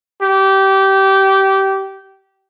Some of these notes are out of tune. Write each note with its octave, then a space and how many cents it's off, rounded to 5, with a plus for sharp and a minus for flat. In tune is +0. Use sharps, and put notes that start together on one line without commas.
G4 -20